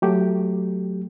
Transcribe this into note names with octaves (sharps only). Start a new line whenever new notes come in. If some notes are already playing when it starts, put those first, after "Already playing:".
F#3 A3 G4